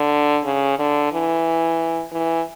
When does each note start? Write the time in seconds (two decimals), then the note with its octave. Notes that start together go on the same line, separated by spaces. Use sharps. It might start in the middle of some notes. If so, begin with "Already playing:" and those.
Already playing: D3
0.45 C#3
0.79 D3
1.13 E3
2.12 E3